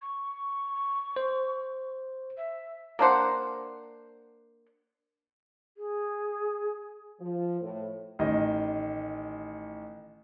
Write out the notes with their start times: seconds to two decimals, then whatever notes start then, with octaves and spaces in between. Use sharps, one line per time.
0.02 C#6
1.16 C5
2.37 E5
2.99 A#3 D4 C5 F#5
5.77 G#4
7.21 F3
7.61 A2
8.19 A1 D#3 D#5